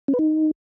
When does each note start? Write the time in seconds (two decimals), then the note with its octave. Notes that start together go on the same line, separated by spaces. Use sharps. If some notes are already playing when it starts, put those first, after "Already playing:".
0.08 C#4
0.14 B4
0.19 D#4